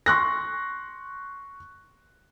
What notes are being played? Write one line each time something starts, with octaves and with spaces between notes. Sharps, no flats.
C6 C#6 F#6 A#6